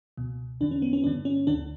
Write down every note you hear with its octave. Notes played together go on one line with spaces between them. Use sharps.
C#2 B2
E2 D3 D4
C#4
B3
C#4
G2 D3 D4
C#4
D2 D3 D4